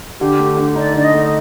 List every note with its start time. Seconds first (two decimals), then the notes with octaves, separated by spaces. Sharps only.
0.20 D3 G4
0.39 A3
0.57 D3
0.75 D#4 D5
0.94 D3 D5
1.03 D#5
1.13 A3